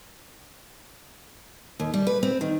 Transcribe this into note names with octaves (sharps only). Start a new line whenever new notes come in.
D#2
G3
B4
C4
D#3